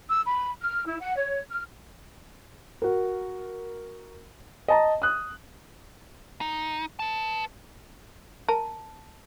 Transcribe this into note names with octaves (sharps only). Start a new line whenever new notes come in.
E6
B5
F6
E4
F#5
C#5
F6
F#4 A#4
D#5 A5 A#5
D#6 F#6
D#4
B4 A5
A#4 A5